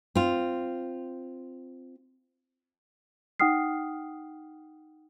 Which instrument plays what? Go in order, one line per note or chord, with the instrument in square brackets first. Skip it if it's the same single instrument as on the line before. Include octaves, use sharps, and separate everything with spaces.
[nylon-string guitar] C4 F4
[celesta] D#4 F#5 G5 D#6 F6 C7